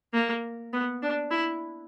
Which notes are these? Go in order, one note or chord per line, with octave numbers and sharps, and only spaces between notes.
A#3
B3
D4
E4